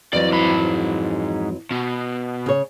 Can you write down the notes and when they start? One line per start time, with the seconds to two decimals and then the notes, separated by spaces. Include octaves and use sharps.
0.13 F2 E3 F#3 D5
0.32 G#2 B5
1.71 B2
2.46 C#3 C#5